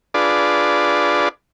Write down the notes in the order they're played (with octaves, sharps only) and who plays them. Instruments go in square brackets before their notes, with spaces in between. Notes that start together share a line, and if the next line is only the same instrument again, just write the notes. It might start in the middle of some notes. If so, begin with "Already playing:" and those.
[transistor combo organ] D4 F4 G#4 B4 D5